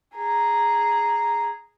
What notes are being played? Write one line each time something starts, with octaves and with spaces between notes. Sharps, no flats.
G#4 A#5